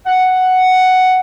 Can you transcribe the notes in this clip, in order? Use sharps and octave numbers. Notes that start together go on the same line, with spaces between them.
F#5